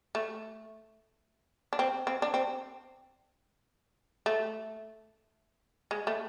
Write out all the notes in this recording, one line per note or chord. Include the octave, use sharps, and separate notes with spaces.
A3
D4
C4
C4
D4
C4
A3
G#3
A3